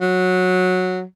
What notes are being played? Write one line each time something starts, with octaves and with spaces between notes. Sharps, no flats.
F#3